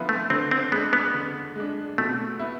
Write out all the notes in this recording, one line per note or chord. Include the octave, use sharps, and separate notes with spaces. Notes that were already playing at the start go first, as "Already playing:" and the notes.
Already playing: D3 F3 B3 E4
A3
D3 C4
C4
G#3 B3 D4
B3
D3
G#3 D4
B2 A3
B3 E4